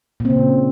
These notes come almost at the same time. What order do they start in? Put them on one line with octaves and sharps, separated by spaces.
A#2 C4 C#3